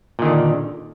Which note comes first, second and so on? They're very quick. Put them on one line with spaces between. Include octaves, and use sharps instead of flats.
A#2 D#3 D3